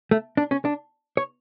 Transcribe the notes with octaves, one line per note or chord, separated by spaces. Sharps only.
A3
D4
C#4
D4
C#5